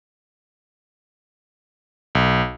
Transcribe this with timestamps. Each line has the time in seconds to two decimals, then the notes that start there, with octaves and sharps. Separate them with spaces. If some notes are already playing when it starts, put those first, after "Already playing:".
2.15 B1